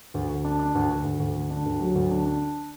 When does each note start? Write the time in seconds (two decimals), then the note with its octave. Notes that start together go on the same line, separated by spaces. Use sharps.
0.14 D2
0.29 D2
0.44 D4
0.59 D4
0.75 D2
0.90 D2
1.04 D2
1.20 D2
1.36 D3
1.50 D4
1.65 D2
1.80 F#3
1.95 D2
2.11 D4
2.25 D4